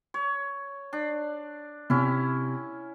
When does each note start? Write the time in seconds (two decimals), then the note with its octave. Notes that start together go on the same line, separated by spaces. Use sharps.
0.14 C#5
0.93 D4
1.90 C3 C#4 E4